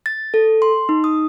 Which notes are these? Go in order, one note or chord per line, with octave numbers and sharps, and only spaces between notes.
A6
A4
C6
D#4
D#6